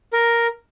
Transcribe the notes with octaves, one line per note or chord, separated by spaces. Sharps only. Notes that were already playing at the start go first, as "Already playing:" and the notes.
A#4